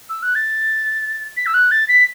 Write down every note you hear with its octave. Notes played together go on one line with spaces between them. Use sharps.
E6
F#6
A6
B6
E6
F#6
A6
B6